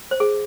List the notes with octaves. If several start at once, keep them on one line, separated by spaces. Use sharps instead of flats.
C5
G#4